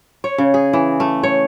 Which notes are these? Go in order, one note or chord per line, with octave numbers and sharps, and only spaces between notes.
C#5
C#3
G#4
E3
A3
C#5